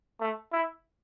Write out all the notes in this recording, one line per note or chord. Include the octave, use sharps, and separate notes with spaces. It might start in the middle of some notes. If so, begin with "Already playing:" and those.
A3
E4